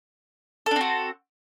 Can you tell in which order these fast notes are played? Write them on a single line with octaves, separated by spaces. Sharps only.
A4 D4 C4 F#4